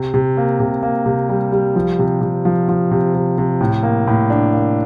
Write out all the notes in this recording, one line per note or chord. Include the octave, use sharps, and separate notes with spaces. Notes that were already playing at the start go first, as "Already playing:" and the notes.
Already playing: C3
C3
A#3
C3
A#3
C3
G3
G3
F3
C3
C3
F3
F3
C3
C3
C3
A2
A#3
A2
D4
A#3